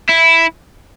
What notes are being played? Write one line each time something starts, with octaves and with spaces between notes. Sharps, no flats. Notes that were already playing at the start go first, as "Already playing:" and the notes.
E4